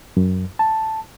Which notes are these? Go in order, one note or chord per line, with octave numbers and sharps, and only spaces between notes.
F#2
A5